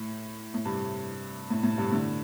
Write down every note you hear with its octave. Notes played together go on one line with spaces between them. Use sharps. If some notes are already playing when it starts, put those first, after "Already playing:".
Already playing: A2
A2
G2 C3
A2
A2
G2 C3
A2 D3